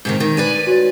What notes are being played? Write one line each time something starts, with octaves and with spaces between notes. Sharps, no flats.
G#2 C3 D#3
D#3
B4 D5 G#5
F#4 C#5